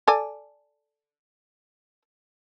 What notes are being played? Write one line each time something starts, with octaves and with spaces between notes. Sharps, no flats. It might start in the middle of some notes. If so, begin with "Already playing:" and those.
A4 D5 G#5